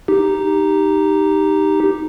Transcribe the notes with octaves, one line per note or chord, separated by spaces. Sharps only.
D#4 G4